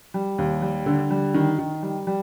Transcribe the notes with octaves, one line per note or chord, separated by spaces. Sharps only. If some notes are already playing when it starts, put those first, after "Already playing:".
G3
D#2
G3
D3
G3
D#3
D#3
G3
G3